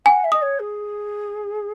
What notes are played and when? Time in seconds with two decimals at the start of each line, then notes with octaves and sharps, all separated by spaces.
0.06 F#5 G#5
0.24 E5
0.32 D#5 D#6
0.42 C#5
0.59 G#4